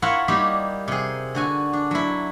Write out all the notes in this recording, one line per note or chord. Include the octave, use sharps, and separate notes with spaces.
E4 F4 A#4 C#5 E5 F#5
G3 A#3 D#4 E4 G4 B5
C3 G#4
D3 F#4 G#5
D4
F#3 E4